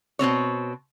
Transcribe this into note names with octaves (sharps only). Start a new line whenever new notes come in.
B2 G#3 C4 C#5